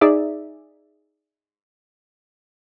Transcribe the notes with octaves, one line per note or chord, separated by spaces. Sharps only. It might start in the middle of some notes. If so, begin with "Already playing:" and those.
D#4 G#4 D5 E5